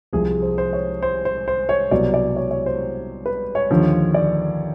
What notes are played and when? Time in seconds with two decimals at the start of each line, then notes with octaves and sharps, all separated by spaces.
0.13 C2 C3 F3 G#4
0.42 C5
0.58 C5
0.73 C#5
1.02 C5
1.25 C5
1.48 C5
1.69 C#5
1.91 C2 B2 F#3 D5
2.14 D5
2.36 C#5
2.51 C#5
2.66 C5
3.26 B4
3.55 C#5
3.71 D#2 D3 F3
4.14 D5